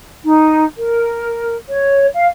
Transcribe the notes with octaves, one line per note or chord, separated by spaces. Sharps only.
D#4
A#4
C#5
F5